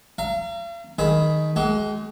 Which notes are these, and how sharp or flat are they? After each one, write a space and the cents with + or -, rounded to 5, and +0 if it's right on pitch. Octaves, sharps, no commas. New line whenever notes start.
F5 -45 A#5 -20
D#3 +0 G#4 +10 B5 +0
G#3 +25 G4 -45